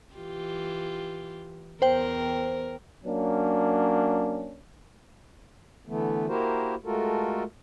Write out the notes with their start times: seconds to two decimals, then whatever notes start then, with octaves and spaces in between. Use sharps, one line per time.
0.14 E3 F4 G4
1.82 E2 A#4 C5 G5
3.05 F#3 A#3 C#4 D4
5.87 D3 E3 A3 B3
6.27 A#3 E4 F#4 G4 A#4 C5
6.85 G#3 A3 F4 F#4 A4 A#4